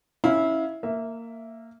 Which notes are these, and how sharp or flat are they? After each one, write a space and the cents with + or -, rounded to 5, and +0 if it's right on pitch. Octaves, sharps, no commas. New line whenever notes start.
C#4 +0 E4 -20 F5 +0
A#3 -15 E5 +0